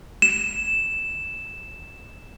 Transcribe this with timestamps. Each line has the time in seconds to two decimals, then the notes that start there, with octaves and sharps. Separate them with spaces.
0.22 E7